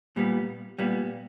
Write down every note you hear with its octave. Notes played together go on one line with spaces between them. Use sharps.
A#2 G3 B3
A#2 G3 B3